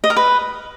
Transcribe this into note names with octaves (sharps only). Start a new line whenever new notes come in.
D#5
A#4
B4